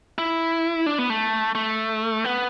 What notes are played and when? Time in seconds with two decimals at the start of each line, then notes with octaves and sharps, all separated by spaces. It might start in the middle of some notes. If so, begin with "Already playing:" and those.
0.18 E4
0.86 D4
0.98 B3
1.10 A3
1.55 A3
2.24 B3